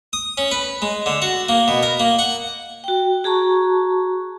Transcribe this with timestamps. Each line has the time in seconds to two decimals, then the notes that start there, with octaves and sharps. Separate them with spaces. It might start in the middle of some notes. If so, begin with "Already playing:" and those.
0.13 D#6
0.38 C#4
0.51 B4
0.82 G#3
1.06 D3
1.22 F#4
1.49 A#3
1.68 B2
1.83 A#4
2.00 A#3
2.19 F#5
2.84 F#4 G5
3.24 F#4 G#4 A5 A#5 C#6